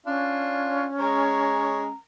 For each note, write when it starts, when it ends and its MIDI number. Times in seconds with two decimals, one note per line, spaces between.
0.06 1.94 61
0.06 0.85 62
0.06 0.85 65
1.00 1.86 56
1.00 1.86 73
1.00 1.91 82